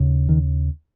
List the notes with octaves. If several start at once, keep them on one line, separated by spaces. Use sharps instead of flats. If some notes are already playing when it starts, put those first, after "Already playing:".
Already playing: D#2 C#3
D#3